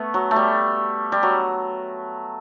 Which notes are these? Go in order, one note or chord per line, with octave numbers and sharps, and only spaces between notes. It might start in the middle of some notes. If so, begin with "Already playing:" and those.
Already playing: A3 B3
F#3
A3
G3
G3
F#3